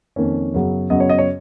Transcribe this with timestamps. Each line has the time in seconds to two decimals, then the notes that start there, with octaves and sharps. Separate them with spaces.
0.16 F2 D#3 A#3 C#4
0.54 F#2 C#3 F#3 B3
0.90 F#2 C#3 F#3 B3 D#5
1.00 C#5
1.10 D#5
1.18 C#5